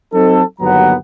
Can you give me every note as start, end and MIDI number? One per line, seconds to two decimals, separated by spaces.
0.14 0.43 54
0.14 0.43 60
0.14 0.43 63
0.14 0.43 69
0.61 0.95 31
0.61 0.95 39
0.61 0.95 54
0.61 0.95 59
0.61 0.95 78
0.61 0.95 82